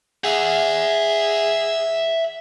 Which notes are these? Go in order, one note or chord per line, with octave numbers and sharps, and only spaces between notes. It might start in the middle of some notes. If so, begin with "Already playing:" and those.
G#4 E5 F#5